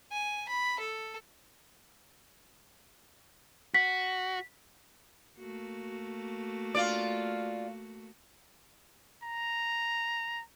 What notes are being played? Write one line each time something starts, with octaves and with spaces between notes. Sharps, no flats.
G#5
B5
A4
F#4 B6
A3 A#3 F#4
F4 D5
A#5